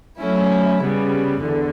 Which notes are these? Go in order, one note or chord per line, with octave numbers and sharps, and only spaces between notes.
F#3 A3 C#4 E4
C#3 G3 B3
E2 D3